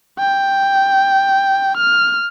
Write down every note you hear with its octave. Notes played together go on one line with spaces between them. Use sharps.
G5
F6